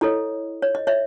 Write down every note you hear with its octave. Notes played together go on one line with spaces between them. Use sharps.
E4 A4 C#5 D#5
C#5
D#5
C#5 E5